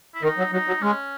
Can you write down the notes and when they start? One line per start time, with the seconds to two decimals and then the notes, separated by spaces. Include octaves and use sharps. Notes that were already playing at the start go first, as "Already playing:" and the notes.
0.15 E4
0.23 D#3 D#4
0.38 F#3
0.52 F#3 D#4
0.67 F#3
0.82 G#3 C#4